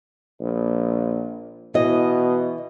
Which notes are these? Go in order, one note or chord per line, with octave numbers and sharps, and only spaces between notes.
A#1
B2 E3 D#5